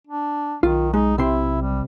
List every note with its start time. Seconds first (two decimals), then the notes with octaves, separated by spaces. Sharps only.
0.07 D4
0.63 B1 D#3 F4
0.93 G#3 D#4
1.18 C3 C4 E4 C6
1.62 G3